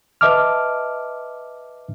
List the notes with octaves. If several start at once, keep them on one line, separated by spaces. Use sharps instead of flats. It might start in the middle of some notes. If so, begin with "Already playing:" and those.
B4 D#5 E5 A5 D6 F6